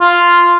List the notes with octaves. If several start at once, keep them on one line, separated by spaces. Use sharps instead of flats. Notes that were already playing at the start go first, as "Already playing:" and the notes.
F4